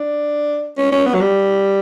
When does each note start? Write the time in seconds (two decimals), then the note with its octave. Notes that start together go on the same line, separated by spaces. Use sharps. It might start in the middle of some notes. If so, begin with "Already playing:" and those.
Already playing: D4
0.77 C#4
0.92 C#4
1.06 B3
1.14 F#3
1.21 G3